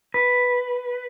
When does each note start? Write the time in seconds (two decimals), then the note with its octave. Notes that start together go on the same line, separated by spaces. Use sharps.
0.14 B4